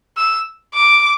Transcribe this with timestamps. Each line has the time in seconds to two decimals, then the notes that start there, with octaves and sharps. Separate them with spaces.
0.17 E6
0.74 D6